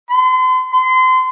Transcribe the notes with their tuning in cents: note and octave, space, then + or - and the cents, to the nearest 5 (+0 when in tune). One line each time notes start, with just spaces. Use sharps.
C6 -40
C6 -30